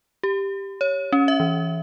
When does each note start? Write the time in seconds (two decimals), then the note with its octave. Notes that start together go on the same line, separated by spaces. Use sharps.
0.23 G4
0.81 C#5
1.12 C#4
1.28 E5
1.40 E3